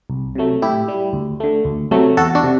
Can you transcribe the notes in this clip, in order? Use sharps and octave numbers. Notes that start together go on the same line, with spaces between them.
C2
C3 F#3 A3
A2 E4 G4
G3
D2
D3 A3
D2
C3 F#3 A3
E2 F#4 A4
D4 F#4
C3